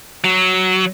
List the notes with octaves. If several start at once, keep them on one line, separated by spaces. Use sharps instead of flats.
F#3